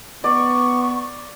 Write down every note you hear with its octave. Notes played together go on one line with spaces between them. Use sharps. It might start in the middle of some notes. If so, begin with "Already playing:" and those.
B3 D5 C#6